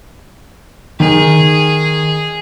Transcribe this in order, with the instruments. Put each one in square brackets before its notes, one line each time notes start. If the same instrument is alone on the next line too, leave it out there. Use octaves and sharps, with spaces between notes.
[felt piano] D#3 [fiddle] G#4